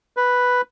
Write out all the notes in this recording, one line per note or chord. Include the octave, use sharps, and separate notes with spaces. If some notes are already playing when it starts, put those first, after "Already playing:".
B4